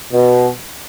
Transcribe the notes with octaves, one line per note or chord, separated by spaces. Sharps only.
B2